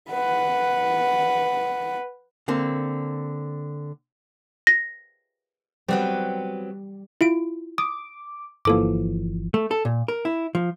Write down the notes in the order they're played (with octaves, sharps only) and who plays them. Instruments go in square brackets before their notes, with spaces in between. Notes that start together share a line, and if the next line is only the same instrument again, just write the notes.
[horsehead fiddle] B4 F#5
[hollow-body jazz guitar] D3 A#3 C4
[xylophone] A#6
[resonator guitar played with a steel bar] F#3 B3 C4 [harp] G3
[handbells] E4 F4 D7
[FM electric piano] D6 [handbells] D#6
[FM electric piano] G1 E3 F3 [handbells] A#3 A4 D6
[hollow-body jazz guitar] A3
A4
A#2
A#4
E4
F3